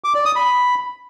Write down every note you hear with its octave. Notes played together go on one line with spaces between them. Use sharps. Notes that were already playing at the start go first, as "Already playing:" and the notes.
D6
D5
D#6
B5